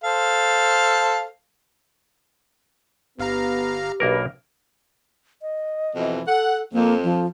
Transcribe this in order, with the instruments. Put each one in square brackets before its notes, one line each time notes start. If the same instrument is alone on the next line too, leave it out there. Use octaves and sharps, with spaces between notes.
[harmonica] A4 C5 F5
[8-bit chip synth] G1 F5 A#5 [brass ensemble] B3 [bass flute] G4
[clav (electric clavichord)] B1 A#3 A#4 [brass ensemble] D4 B4
[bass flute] D#5
[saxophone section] F2 B2 E3
[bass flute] A4 [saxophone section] F#5
[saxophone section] F2 [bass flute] A#3
[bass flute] F3